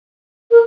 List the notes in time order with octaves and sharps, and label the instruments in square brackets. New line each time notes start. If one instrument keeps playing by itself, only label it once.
[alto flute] A#4